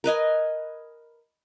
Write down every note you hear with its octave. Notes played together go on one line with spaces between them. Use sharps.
A#4 B4 D#5 G#5